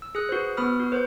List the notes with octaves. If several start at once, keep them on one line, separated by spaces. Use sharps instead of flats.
E6
G#4 D#6 F#6
F#4 B4 C5
B3 B4 B5 D#6 F6
F#4
B4 C5 G6